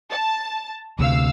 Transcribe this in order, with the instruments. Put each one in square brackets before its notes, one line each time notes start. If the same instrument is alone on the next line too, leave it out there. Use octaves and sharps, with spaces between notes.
[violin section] A5
[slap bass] D2 C3 [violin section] F5 E6